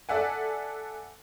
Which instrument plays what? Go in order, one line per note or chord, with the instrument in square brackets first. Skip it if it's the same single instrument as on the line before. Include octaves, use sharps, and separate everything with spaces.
[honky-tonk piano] A4 D5 E5 F#5 G#5